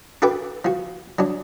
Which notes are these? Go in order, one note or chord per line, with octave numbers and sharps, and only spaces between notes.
F#4 A4 B4 G5 D6
F3 F#4
F#3 D4